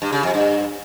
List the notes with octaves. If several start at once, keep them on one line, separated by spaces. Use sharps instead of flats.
G2
C#3
F2
G2